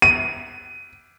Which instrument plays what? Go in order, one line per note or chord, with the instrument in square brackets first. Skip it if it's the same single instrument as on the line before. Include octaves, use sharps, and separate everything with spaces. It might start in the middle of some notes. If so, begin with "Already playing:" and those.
[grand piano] D#7